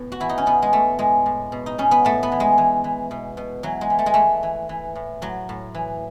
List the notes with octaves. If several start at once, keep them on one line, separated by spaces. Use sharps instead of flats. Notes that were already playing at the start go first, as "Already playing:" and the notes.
Already playing: A2 B3
F#4
E3 E4
D#4
C#4
B2 B3
G#3
B2 A3
A2 G#3
A2
B2
D#4
B2 C#4
B3
A2 A3
B3
E3
G#3
E3
E3
B2
B2
E3 F#3
G#3
E3
A3
G#3
E3 A3
E3
E3
A2
A2 F#3
A2
E3